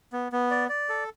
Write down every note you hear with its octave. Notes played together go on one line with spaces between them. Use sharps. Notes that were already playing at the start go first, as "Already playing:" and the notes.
B3
B3
D5
D5
A4